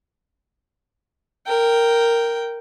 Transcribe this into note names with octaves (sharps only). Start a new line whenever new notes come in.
A#4 G5